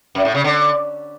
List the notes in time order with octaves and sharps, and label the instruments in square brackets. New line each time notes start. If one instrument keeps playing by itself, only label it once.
[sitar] F#2
A2
C#3
D3